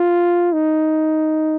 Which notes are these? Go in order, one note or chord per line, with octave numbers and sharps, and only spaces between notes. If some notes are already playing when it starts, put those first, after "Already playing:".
Already playing: F4
D#4